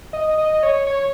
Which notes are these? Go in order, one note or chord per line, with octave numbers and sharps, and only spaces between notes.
D#5
D#5
C#5
C#5